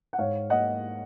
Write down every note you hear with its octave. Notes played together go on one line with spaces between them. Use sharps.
F#5
G#2 C#5 F5
A#3 D#5 F#5